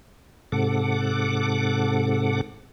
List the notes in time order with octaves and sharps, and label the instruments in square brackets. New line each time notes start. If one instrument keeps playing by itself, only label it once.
[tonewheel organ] G#2 C3 A4 F#5 D6